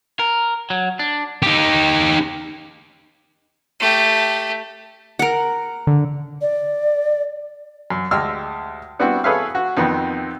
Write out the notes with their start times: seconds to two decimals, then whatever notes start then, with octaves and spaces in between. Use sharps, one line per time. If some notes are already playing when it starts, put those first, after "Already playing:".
0.19 A#4
0.70 F#3
0.99 D4
1.42 D#4 G4
3.80 A3 G4
5.19 A#4 F#5
5.87 D3
6.41 D5
7.90 F#2
8.11 D2 G#3 G4 E6 F6
8.99 G3 B3 C4 D4 E4 F#4
9.24 G#4 A4 B4 C#5 E5 F5
9.55 F#4
9.77 F2 D#3 B3 C4